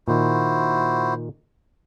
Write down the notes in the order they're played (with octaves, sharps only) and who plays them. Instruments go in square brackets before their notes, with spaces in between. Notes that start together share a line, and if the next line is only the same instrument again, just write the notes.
[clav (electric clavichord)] A#2 D#3 [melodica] E4 F#4 C5